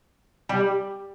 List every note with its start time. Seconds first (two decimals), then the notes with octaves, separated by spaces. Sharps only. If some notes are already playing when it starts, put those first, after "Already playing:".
0.49 G3